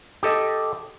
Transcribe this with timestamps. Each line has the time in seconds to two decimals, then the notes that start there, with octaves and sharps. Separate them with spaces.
0.23 G4 A4 D#5